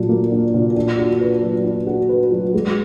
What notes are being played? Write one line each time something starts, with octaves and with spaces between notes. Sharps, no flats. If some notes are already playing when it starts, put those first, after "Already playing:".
Already playing: A#2 F#3 D4
A#3
D4
A#2
D4
F#4
B4
F#3
D4
F#4
B4
F#3
G#3